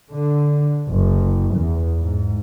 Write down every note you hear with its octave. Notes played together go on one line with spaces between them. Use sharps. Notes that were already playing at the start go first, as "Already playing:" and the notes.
D3
F#1
E2
G#2